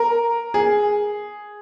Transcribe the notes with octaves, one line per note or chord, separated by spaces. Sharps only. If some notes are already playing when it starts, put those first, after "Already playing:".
Already playing: A#4
G#4